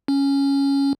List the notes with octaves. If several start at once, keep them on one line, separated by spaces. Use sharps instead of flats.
C#4